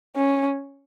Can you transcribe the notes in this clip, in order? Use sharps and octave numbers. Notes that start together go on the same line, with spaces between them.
C#4